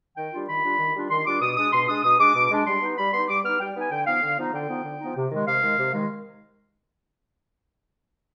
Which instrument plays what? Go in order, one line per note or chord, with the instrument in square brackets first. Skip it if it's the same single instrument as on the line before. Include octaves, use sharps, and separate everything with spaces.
[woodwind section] D#3 G5
G3 D4 F4
D#3 B5
G3 D4 F4
D#3
G3 D4 F4
D#3 C6
G3 D4 F4 D6
B2 D#6
G#3 D4 D#6
B2 C6
G#3 D4 D#6
B2 D#6
G#3 D4 D6
B2
G#3 D4
G3 C6
B3 D#4
G3 B5
B3 D#4 C6
G3 D6
B3 D#4 F6
G3 G5
B3 D#4 G#5
D3 G5
F3 B3 D#4 F5
D3
F3 B3 D#4
D3 G5
F3 B3 D#4
D3
F3 B3 D#4
C3
D#3 G#3
C3 F5
D#3 G#3
C3
D#3 G#3